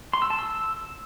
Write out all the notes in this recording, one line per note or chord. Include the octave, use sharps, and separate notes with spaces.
C6
E6
A5
E6